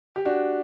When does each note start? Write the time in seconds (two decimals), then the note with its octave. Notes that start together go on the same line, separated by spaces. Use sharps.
0.16 G4
0.25 D4 F#4